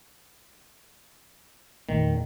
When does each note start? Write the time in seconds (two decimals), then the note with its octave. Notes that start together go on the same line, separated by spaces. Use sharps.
1.89 E2 A#2 D#3 A3